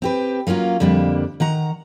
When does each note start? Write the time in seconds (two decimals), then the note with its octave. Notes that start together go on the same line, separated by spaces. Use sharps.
0.02 C4 G4 B4
0.47 F#3 A#3 C#4 F4
0.80 F2 D3 G3 A#3 D4
1.40 D#3 F#5 A#5